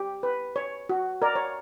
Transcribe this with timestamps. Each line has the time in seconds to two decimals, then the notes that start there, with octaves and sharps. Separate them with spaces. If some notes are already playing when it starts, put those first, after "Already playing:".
Already playing: G4
0.23 B4
0.56 C#5
0.89 F#4
1.22 A#4 D5
1.35 C#5